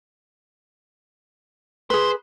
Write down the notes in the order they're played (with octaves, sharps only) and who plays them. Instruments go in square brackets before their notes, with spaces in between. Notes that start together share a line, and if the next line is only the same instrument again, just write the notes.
[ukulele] G#4 B4 [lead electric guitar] C5